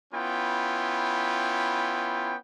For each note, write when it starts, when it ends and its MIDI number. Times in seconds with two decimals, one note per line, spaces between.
0.13 2.34 59
0.13 2.34 61
0.13 2.34 64
0.13 2.34 65
0.13 2.34 79